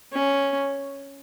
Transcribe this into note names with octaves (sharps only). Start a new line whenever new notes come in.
C#4